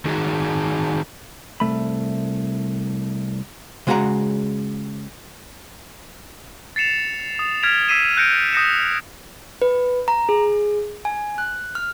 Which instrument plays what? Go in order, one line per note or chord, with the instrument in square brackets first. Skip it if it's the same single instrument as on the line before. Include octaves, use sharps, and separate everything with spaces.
[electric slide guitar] D#3 D#4 F#4 G#4
[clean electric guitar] C2 A3 B5
[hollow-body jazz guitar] C#3 G#3 F#4 B4 F#5 A#5
[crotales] A6 C7 C#7 E7 F7
D#6
F6 G#6 B6 D7 F7
D#6 E6 B6 C7 D#7 E7
F#6 G6 A#6 C#7 D7
D#6 G6 A#6 C#7 E7
[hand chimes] B4
A#5
G#4
G#5
F#6
F6